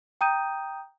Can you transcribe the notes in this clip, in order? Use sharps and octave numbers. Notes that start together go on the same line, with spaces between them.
G5 A#5 D#6 G6 D#7